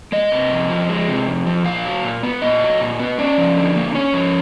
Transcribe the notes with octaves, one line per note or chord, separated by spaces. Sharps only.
G#3 D#5
C3
F2
F3
G#3
C3
F2
F3
A#2 F5
F#3
A#2
B3
A#2 D#5
F#3
A#2
B3
C#4 D5
F3
D3
A#3
C#4 C#5
F3